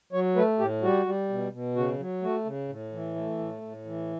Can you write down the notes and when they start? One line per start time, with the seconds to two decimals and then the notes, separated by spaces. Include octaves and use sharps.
0.13 F#3 C#5
0.36 A3 B4
0.59 A2 G4
0.82 G3 F#4
1.06 G3
1.29 B2
1.52 B2
1.76 C#3 F#4
1.99 F#3
2.22 A3 F#4
2.45 C#3
2.69 A2
2.92 E3
3.15 A3
3.39 A2
3.62 A2
3.85 E3